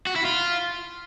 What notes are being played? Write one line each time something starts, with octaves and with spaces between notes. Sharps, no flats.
F#4
E4
F4